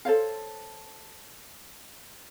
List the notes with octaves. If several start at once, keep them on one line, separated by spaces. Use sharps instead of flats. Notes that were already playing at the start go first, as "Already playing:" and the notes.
A4 C5 C#5 F5